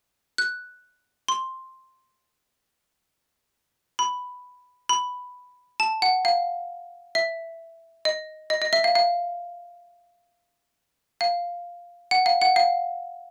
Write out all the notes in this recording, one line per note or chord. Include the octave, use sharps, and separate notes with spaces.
F#6
C6
B5
B5
A5
F#5
F5
E5
D#5
D#5
D#5
E5
F5
F5
F5
F#5
F5
F#5
F5